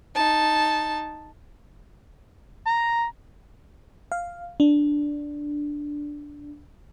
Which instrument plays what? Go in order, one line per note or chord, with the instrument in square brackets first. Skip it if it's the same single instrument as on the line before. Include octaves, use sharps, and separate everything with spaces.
[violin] D#4 A5
[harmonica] A#5
[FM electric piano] F5
D4